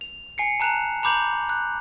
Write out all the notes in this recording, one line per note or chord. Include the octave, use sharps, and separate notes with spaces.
F7
G#5 C7 C#7
A5 A#5 F#6 E7 F7
A#5 B5 D6 G6 F7 F#7
F#6